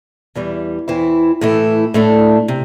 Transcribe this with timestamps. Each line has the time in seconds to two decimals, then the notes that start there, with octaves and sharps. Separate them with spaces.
0.35 E2 E3 G3
0.88 E2 E3 C4 E4
1.41 A2 E3 A3 E4
1.94 A2 A3 D4
2.48 C3